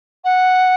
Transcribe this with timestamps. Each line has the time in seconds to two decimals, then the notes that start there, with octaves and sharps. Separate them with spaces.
0.24 F#5